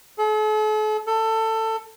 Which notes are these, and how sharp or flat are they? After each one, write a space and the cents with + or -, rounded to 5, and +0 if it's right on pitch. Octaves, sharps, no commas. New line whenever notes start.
A4 -45
A4 +20